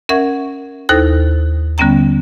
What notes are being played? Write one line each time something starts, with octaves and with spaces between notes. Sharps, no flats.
C#4 A#4 E5 F#5 C#6 G#6
D#2 D#4 E4 A4 C5 A#6
D3 G3 B3 C#4 G5 A#5